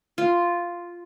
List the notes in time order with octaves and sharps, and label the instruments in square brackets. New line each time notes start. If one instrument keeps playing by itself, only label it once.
[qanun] F4